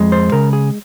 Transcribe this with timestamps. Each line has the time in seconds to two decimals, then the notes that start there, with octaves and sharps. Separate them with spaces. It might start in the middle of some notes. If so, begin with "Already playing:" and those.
Already playing: F2 G#3
0.12 C5
0.32 C#3 A#4
0.53 G#4